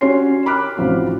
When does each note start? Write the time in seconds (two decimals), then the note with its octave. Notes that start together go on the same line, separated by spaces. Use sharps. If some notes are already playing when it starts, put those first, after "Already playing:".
0.01 C#4 F#4 G4 C#5 C6 C7
0.46 B5 D6 F6 F#6
0.77 A1 C3 F3 F#4